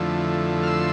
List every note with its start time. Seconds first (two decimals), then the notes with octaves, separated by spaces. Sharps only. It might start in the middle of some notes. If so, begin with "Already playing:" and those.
Already playing: F2 D3 F3 A3 E4
0.63 F6
0.67 C6 E6